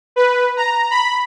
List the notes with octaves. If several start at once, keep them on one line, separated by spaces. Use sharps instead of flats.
B4
A#5
B5